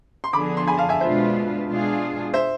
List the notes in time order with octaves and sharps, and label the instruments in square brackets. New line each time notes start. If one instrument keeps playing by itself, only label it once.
[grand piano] C6
[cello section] D3 F3 B3 D4 G#4 [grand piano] B5 D6
[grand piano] C6
G#5 B5
F5 A5
E5 G#5
[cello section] B2 G#3 D4 F4 B4 [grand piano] C5 E5
[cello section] B2 G#3 D4 F4 G#4
[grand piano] C5 E5